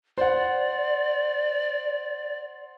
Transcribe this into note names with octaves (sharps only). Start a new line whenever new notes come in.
C5 D5 F#5